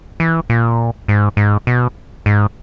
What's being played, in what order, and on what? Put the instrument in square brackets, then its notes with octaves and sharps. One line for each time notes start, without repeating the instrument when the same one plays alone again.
[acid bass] E3
A#2
G#2
G#2
B2
G#2